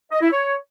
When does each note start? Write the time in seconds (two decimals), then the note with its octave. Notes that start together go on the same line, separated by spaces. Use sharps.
0.12 D#5
0.22 E4
0.32 C#5